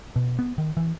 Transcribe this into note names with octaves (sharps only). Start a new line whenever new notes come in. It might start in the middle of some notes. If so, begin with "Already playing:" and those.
B2
B3
D#3
E3